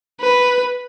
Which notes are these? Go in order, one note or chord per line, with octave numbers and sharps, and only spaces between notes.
B4